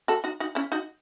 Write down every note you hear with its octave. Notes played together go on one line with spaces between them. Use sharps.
F#4 A4
D#4 F#4
D#4 F#4
C#4 E4
D#4 F#4